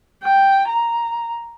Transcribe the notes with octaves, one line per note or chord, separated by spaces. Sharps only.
G5
A#5